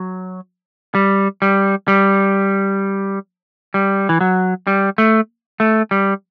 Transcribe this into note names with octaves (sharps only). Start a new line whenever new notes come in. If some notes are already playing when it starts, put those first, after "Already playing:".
Already playing: F#3
G3
G3
G3
G3
E3
F#3
G3
A3
A3
G3